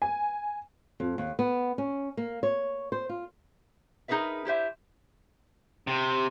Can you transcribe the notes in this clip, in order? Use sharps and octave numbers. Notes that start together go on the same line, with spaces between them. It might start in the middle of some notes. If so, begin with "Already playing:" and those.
G#5
F2
D#2
B3
C#4
A#3
C#5
C5
F4
D#4 G#4 A#4 B4 E5
E4 G4 C5 E5
C3